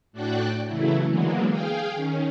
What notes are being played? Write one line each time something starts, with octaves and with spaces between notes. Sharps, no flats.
A2 D4 F#4 D5 G5 F#6
C#3 E3 F#3 A3 E4
D3 E3 F#3 G#3 A#3 B3
G#4 F5 G5
D#3 C#4